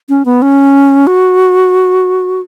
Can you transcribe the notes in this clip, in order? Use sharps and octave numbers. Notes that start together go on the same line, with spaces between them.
C#4
B3
C#4
F#4